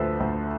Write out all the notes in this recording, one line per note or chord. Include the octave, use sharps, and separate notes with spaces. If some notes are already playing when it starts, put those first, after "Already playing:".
Already playing: D2 D3 F3 A4 B4 C5
D2